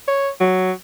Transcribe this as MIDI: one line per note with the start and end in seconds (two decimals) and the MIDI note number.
0.08 0.29 73
0.40 0.72 54